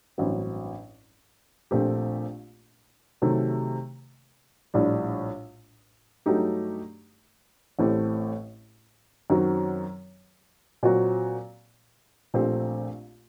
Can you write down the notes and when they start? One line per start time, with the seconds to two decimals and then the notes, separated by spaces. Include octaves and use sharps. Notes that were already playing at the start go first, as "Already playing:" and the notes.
0.18 A1 G2 F#3 C4
1.71 A#1 A#2 A3 C4 G4
3.22 C3 D#3 F#3 A3
4.74 A#1 A2 G3 D4
6.26 G2 F#3 A3 D#4 G4
7.79 A1 A2 A3 C4 G4
9.30 F#2 D#3 F#3 C4 F#4
10.83 A#2 F#3 C4 F#4
12.34 A#1 A#2 A3 C4 G4